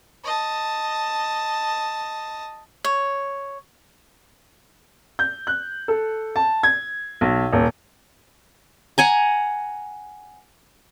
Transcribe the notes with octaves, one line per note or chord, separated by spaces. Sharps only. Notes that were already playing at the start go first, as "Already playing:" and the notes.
D#5 A5
C#5
G6
F#6
A4
A5
G#6
B1
D#1
F#5 G#5 A#5